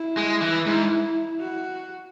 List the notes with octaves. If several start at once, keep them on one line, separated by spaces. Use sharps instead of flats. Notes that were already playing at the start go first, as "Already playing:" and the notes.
Already playing: E4
G#3
E3
G#2
F#4